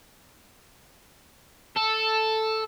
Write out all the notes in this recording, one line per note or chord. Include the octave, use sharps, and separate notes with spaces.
A4